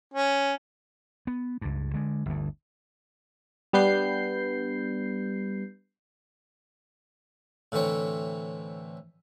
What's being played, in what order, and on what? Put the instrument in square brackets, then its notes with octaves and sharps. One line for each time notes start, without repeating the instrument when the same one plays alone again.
[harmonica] C#4
[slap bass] B3
C#2 G2
D3 G#3
G1 D2
[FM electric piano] G3 B3 D4 B4 G6 C7
[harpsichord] A2 D3 E3 C4 C#5